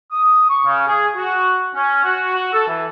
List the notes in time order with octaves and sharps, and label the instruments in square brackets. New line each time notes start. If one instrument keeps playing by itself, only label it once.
[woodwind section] D#6
C#6
C#3
G#4
F#4
C#4
F#4
F#4
A4
E3